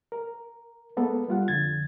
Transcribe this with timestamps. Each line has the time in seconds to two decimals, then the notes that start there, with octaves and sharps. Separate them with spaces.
0.12 A#4
0.97 G#3 A#3 B3 A4
1.28 G3 F4 F#5
1.48 F2 D3 G#6 A6